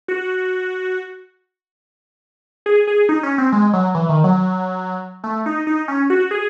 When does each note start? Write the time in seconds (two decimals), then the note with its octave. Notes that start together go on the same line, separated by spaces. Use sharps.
0.08 F#4
2.66 G#4
2.87 G#4
3.09 D#4
3.23 C#4
3.38 C4
3.52 G#3
3.73 F#3
3.95 E3
4.09 D#3
4.24 F#3
5.24 A3
5.46 D#4
5.67 D#4
5.88 C#4
6.10 F#4
6.31 G#4